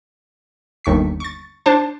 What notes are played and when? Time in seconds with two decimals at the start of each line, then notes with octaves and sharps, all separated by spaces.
0.84 G1 D#2 C#6 B6
1.20 C#6 A6
1.66 D4 C5 A5